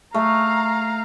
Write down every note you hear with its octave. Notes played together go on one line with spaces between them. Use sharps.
A3 F5 A#5